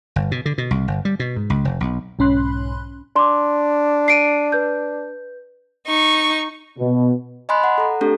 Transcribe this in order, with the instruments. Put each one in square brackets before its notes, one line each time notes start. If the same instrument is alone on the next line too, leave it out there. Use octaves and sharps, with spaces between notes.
[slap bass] G1
B2
D3
B2
C2
G1
G3
B2
G#2
C#2
F1
B1
[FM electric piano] B1 G#2 C#4 B5 C6 F#6
[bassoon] D4 [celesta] C6 D6
[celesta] C7 D7 D#7
B4 G6
[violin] D#4 C#6
[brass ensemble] B2
[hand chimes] D#5 G#5 B5 C6 F#6
F#5
A4 A#5
A3 C4 D4 G4 A4